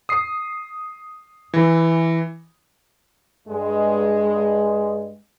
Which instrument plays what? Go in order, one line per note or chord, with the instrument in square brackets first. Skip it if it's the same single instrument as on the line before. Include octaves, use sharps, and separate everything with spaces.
[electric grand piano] D#6 C7
E3
[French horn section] G2 G#3